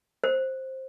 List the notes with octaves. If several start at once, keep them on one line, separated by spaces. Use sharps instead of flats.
C5